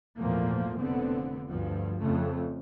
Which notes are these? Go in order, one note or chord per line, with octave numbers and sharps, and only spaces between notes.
G#1 E2 A#2 F3 A3 A#3
F1 D3 B3 C4
D2 G2 F3
F2 C#3 F3 A3